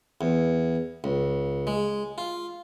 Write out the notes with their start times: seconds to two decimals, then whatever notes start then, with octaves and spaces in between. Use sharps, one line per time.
0.21 E2
1.04 C#2
1.67 G#3
2.18 F4